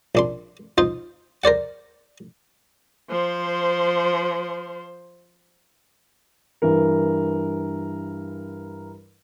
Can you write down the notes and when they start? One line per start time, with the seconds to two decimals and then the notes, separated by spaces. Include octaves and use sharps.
0.15 A#1 D4 C6
0.78 D#4 F4 C5
1.44 A#4 C5 D5 F#5
3.09 F3 C5
6.62 G2 E3 A#4